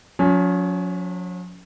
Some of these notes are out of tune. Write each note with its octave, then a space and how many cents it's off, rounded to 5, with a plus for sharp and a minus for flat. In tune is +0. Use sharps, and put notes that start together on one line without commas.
F#3 -45 C#4 +25